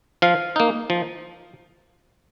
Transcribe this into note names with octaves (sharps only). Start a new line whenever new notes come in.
F3 F5
A#3 D#4
F3